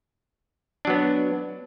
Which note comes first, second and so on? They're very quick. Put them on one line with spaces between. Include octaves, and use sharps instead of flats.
D4 F#3 B3